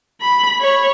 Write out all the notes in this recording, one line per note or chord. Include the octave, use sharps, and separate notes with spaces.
B5
C#5